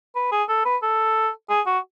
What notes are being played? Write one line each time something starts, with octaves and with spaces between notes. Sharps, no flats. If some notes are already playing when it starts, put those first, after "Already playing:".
B4
G#4
A4
B4
A4
G#4
F#4